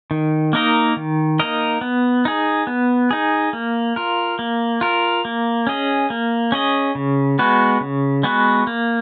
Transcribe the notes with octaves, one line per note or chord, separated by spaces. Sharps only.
D#3
A#3 D#4 A#4 D#5
D#3
A#3 D#4 A#4 D#5
B3
D#4 G#4
B3
D#4 G#4
A#3
F4 A#4
A#3
F4 A#4
A#3
C#4 G#4 D#5
A#3
C#4 G#4 D#5
C#3
G#3 B3 F#4 B4
C#3
G#3 B3 F#4 B4
A#3